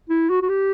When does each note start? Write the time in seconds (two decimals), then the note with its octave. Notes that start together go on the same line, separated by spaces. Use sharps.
0.09 E4
0.30 F#4
0.42 F#4
0.49 G4